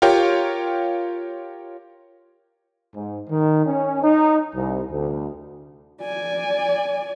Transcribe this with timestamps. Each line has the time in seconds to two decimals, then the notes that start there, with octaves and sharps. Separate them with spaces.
0.02 F4 G4 A#4 C#5 F5 G5
2.95 G#2
3.30 D#3
3.66 C#4
4.03 D#4
4.55 C2
4.91 D2
6.01 D5 G#5